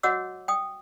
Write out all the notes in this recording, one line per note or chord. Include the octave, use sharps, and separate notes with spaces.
F#4 C#5 D#5 F#5 D6 E6
G5 D#6